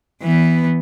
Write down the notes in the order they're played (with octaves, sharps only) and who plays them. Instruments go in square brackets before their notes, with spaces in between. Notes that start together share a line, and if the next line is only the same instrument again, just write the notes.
[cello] E3 B3